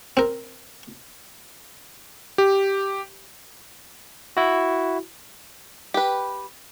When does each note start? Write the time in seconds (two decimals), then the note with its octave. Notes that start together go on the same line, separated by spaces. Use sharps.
0.17 C4 A#4
2.38 G4
4.37 E4 F#4
5.94 G4 B4